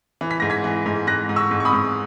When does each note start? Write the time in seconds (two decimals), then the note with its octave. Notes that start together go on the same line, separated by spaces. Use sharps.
0.21 E3
0.31 B6
0.40 G#2 A#6
0.50 G#6 B6
0.64 E3
0.86 G#2
1.07 G#2 F#6 A#6
1.29 G#2
1.36 C#6 E6
1.51 G#2
1.60 C#6
1.65 B5 D#6
1.73 G#2